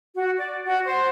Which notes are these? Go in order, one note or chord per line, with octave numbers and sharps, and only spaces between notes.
F#4
D5
F#4
C5